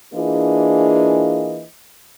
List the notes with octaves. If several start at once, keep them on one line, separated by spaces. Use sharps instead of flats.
E3 A#3 D4 F4 G#4 D#5